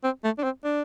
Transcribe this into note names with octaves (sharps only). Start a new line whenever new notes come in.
C4
A3
D4
C4
D4